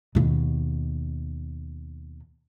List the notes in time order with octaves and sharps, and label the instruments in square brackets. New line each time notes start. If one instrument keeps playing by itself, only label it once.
[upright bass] D#2 B2